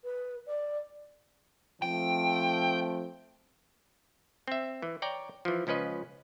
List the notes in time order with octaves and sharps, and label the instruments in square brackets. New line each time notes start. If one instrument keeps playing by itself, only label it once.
[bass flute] B4
D5
[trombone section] F3 A3 C4 [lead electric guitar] G5
[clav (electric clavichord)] C4 E5
E3
C#5 D5 G5 A#5
E3 F3
C#2 F3 C#4 B4 D#5